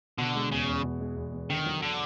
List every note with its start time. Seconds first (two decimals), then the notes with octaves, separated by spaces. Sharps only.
0.18 B2 D3
0.35 G#3
0.52 E2 C#3
0.68 E2
0.84 B2
1.00 G#3
1.17 E2
1.33 E2
1.50 D3 D#3
1.66 F#3
1.82 D3